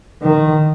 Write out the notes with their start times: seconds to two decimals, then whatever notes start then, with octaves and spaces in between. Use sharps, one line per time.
0.22 D#3